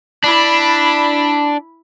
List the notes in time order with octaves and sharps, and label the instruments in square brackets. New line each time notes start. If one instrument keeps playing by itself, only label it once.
[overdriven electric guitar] D4 [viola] E4 B5